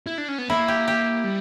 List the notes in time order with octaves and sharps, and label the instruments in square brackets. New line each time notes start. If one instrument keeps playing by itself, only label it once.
[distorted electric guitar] E4
D4
C#4
B3
[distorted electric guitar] A#3 [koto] E4
[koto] G4
G4
[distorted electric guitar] G3